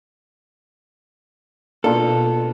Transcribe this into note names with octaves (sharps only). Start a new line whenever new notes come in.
B2 A#3 D4 F4 A4